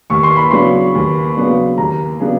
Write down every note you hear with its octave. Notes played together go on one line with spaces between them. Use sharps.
D#2 C#6
C6
B5
C#3 F#3 B3 D4 C6
D#2
C#3 F#3 B3 D4
D#2 A#5
C#3 F#3 B3 D4